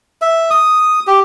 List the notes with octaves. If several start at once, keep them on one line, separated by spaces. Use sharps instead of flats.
E5
D#6
G4